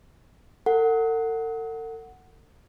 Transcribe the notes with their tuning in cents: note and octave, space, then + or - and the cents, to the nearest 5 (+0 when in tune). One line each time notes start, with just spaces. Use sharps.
A4 +45 F#5 +0